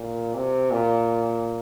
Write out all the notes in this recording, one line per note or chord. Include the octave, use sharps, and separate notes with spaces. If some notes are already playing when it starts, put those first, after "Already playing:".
Already playing: A#2
C3
A#2